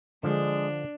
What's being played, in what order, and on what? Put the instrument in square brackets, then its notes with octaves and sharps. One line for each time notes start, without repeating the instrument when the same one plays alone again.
[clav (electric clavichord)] D3 F3 [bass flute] G#3 [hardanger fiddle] D4